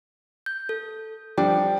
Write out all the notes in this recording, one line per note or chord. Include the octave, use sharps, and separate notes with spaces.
G6
A4
F3 G3 D4 G5